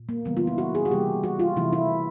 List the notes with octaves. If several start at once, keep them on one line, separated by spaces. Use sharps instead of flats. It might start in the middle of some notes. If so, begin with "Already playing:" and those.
Already playing: A#2
A#3
C#3 E3 G3 B3
F4
E4
F#4
G#4
F#4
C3 E3 G3 A#3 G4
F#4
F4
C3 E3 A3 E4
E4